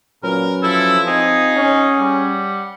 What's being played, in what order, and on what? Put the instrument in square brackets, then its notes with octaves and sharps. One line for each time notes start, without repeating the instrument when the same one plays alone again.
[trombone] A#2 [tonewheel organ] F#3 C#4 B4 [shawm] A#4
[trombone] F3 [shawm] E4 [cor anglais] A4
[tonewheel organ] C4 F4 [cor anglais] D#4 [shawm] G#4
[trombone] C#4 [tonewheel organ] F#5
[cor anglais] G3